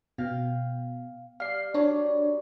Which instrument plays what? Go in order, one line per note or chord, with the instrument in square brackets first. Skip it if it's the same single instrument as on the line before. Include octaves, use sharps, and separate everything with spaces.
[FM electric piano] B2 [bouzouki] F5 G5
[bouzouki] G3 [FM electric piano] F5 C7
[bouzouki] F#3 G3 D5 [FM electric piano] D4 C#5